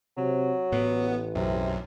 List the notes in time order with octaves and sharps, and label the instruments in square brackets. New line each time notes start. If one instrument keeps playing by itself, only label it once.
[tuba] C3 [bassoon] F#3
[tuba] A1 [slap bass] A2 [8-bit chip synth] B3
[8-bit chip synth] B1 F#2 [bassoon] C3